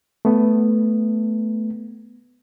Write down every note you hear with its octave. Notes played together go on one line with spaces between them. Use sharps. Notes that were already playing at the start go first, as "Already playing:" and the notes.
A3 B3